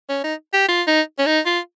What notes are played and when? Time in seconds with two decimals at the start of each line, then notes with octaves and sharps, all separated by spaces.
0.09 C#4
0.24 D#4
0.53 G4
0.68 F4
0.87 D#4
1.19 C#4
1.26 D#4
1.46 F4